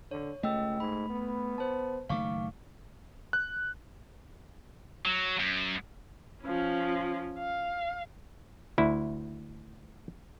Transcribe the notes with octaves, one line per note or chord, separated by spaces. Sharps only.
D3 C#5
C#2 A3 D#5 G5 E6
G#2 B5
B3
C5 A5
F#1 D#3 A3 F5 C#6 D6
F#6
F#3
F#2
F3 C#4
F5
D2 E4